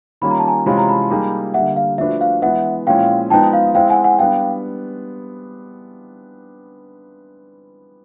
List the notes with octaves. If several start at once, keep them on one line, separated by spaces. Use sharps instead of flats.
D#3 G3 A#3 C#4 F4 B5
A#5
A5
G#5 A#5
C3 E3 G#3 C#4 F4 B5
A#5
A5 B5
G3 A#3 D#4 G#4
D3 G3 A#3 E5 F#5
F5
F3 A3 D4 F#4 B4 E5
F5
E3 G#3 B3 E5 F#5
A#2 F3 G#3 C#4 E4 F5 G5
F3 G#3 B3 D#4 G5 A5
F5
G#3 C4 E4 F5 G5
F#5 G#5
F#5 G#5
G3 B3 D4 F5 G5